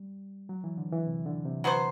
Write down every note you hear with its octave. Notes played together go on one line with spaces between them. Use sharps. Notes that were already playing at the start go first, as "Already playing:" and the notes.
Already playing: G3
F#3
E3
D3
E3
C3
D3
C3
F#3 B3 F#4 C5